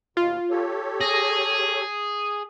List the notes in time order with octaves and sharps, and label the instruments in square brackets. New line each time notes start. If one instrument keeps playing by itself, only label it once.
[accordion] D#2 B2 [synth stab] F4
[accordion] G4 A4 C#5
[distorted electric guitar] G#4 [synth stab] A#6